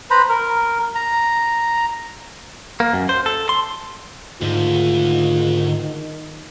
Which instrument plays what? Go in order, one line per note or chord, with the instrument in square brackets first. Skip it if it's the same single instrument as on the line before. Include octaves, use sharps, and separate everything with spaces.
[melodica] B4 C5 A#5 B5
A#4
A#5
[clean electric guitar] A#3
F#2
C5
A4
C6
[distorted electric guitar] D2 [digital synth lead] G#2 [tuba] D#3 [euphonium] F4